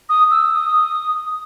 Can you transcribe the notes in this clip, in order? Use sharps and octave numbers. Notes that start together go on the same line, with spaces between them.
D#6
E6
D#6